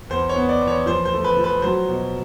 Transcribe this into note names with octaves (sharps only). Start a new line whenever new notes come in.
E2 C5
C#5
B3
D5
E2
C#5
F3 C5
C5
A3
B4
F3
B4
F#3 C5
B2